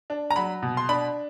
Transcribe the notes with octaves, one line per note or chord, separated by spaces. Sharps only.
D4
A#5
F#3 B5
B2
C6
D4 B5